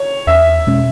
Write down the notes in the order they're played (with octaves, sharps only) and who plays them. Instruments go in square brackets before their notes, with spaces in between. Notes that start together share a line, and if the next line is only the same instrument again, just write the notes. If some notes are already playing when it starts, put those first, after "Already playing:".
Already playing: [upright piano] C#5
[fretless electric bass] E2 [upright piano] E5
[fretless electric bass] B2 G#3 C#4